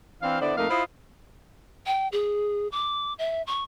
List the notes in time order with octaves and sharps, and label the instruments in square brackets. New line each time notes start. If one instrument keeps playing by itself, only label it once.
[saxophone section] E3 C4 D4 C5 F5
D3 B3 D4 E4 C5 D5
F2 A3 A#3 D#4 A#4 F5
E4 F4 C5 D#5
[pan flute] G5
G#4
D6
E5
C#6